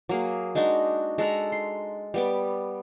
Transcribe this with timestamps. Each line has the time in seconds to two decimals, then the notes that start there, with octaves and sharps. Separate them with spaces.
0.09 F#3 A#3 G#4
0.55 G#3 D4 D#4 F#4
1.18 G#3 A4 F#5 A#5
1.52 C6
2.14 G3 B3 D6